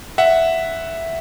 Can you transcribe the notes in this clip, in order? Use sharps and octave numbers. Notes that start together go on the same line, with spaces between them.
E5 F#5